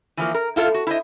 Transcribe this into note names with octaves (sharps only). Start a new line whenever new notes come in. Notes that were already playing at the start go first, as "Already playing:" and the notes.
E3 F3 A#3
A#4
E4 F4 A4 C5 F5
F#4
E4 C5 D#5